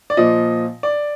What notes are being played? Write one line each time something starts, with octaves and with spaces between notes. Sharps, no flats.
D5
A#2 F3 D#5
D5